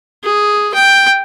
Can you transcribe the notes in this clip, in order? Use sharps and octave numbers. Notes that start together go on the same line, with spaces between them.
G#4
G5